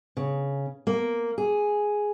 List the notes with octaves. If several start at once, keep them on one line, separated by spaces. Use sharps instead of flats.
C#3
A#3
G#4